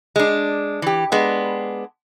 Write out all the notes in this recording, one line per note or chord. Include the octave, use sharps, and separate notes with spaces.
G#3 D4
E3 G4
G#3 B3 D4